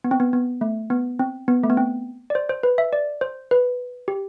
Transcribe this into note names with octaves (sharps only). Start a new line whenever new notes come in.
B3
C4
B3
B3
A3
B3
C4
B3
A3
B3
C4
D5
C5
C5
B4
E5
D5
C5
B4
G4